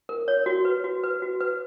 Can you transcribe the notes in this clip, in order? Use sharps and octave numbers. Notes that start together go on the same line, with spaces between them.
A#4
C#5
F#4
B4
F#4
B4
F#4
B4